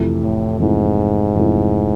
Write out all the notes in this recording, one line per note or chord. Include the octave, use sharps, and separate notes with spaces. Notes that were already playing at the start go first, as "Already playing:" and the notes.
Already playing: F2 C3 E3 A3
A2
F2 G#2 C3 E3 A3
F2 C3 E3 A3